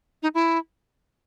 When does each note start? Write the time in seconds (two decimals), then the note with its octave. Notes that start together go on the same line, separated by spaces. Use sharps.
0.23 D#4
0.35 E4